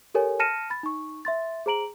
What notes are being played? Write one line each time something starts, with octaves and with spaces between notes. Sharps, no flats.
G4 A4 A#4 C#5 G#5
A5 F6 A#6 C#7 D#7 E7
B5 A6
D#4 C#6
E5 C6 A6
G#4 C5 A#5 D7 F#7